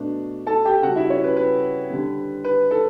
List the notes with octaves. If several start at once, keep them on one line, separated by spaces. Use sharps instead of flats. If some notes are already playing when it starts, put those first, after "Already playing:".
Already playing: B2 A3 D4
A4 A5
G4 G5
C#3 G3 F#4 F#5
E4 E5
C#4 C#5
B4
B4
D3 G3
B4
A4